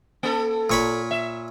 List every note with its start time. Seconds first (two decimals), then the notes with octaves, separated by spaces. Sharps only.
0.23 A#3 A4
0.70 A#2 C#5 B5
1.11 E5